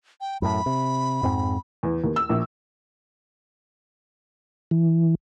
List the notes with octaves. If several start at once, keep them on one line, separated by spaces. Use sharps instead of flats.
G5
F#2 A2 B5
C3
F2 G#2 C4
E2
D#2
E6
A#1
E3